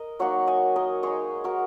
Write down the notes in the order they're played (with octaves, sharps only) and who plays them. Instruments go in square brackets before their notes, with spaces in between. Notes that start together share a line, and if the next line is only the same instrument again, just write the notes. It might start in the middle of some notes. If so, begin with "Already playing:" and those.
Already playing: [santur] A#4 D#5
F#3 A#3 D#4 C#5 F#5
D#5 G#5
A#4 D#5
G#3 D#4 G#4 C#5
F#4 A#4